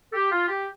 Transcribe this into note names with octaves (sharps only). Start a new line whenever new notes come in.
A4
G4
F4
G4